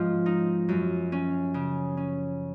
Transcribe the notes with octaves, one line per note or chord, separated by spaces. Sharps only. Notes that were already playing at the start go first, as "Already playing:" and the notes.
Already playing: G#2 F3 C#4 F4
D#4
F#2
C#4
C#3
C#4